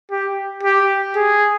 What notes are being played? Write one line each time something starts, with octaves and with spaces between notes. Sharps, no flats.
G4
G4
G#4